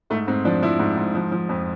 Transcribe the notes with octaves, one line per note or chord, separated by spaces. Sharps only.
G#2 A3
G#2 C4
F3 D4
F3 E4
G#2
G#2
F3
F3
F2